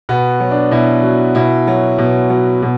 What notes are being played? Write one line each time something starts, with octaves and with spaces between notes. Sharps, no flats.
B2 B3
F#3
D4
B2 E4
F#3
B2 E4
F#3
B2
F#3
B2